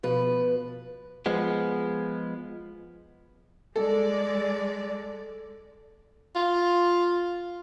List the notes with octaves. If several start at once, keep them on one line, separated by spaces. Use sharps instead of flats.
B2 F3 B4
F3 G#3 B3
G#3 A4 D5
F4